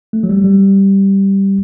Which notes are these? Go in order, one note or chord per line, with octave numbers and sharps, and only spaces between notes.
A3
F#3
G3
G3